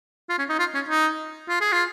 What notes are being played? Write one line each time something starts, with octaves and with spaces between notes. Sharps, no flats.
F4
C#4
D#4
F4
C#4
D#4
F4
G#4
F4